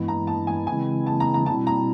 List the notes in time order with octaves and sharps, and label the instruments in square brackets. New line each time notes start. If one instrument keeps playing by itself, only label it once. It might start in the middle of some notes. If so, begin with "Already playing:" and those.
Already playing: [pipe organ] G2 E3 G#3 B3 E4
[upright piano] A#5
A5
G#5
[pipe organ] C#3 E3 G#3 C4 E4 [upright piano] G#5
[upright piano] A5
A#5
A#5
[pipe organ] B2 G3 C4 E4 [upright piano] A5
[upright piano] A#5